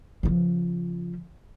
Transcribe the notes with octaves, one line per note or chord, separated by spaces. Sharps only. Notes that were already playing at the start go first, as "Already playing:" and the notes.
C#3 F3